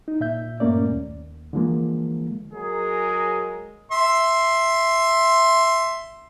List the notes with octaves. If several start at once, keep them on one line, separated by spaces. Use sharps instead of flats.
D#4
A#2 E5 G6
G2 A#2 A3 A#3 C#4 D5
D#2
D3 E3 F3 G#3 A#3
F#3 G#3 G#4 A#4
E5 C6